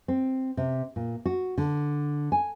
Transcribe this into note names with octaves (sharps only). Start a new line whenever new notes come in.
C4
C3
A#2
F#4
D3
G#5